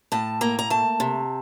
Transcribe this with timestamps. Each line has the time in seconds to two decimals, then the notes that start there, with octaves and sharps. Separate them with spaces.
0.12 A2 A5
0.41 A#3 A#5
0.59 A#5
0.70 A3 A5
1.00 C3